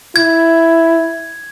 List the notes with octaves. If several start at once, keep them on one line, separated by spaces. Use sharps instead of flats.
E4 G#6